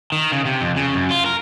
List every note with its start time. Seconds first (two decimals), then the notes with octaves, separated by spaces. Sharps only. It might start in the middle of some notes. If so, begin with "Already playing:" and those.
0.12 D#3
0.32 C#3
0.45 C3
0.61 F2
0.76 C#3
0.94 F#2
1.11 F4
1.26 A#4